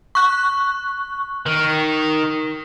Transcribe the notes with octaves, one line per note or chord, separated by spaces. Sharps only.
C#6 F#6
D#3